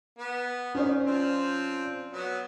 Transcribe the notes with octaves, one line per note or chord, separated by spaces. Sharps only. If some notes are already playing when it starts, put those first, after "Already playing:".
B3
D#3 C#4 C5 D5
F3 C4
F#3 B3